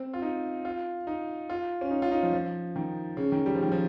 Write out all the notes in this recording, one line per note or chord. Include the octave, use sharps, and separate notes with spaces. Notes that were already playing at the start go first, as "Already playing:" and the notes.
Already playing: C4
F4
D#4
F4
D#4
F4
C#4
D#4
F4
D#4
F3
F3
D#3
C#3
D#3
G3
F3
D#3
F3